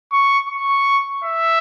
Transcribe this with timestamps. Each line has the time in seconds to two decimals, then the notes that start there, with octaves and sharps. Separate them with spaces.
0.12 C#6
0.49 C#6
1.24 E5